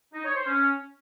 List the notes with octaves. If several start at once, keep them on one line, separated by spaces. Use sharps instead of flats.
D#4
C#5
C5
C#4